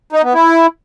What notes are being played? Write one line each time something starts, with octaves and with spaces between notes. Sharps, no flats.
D#4
B3
E4